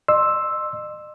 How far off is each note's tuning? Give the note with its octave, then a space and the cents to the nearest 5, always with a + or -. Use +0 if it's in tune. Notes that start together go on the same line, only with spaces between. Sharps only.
D#5 -45 C6 +15 E6 +0